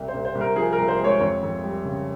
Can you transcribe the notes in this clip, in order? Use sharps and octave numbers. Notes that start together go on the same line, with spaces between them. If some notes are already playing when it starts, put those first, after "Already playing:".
Already playing: C2
C5
C2
C5
C2
A#4
F3 G#4
A#4
C2
C5
G#3 C#5
F2 C#5
F2
G3
C#3